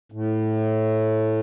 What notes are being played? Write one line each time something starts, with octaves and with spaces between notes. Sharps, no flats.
A2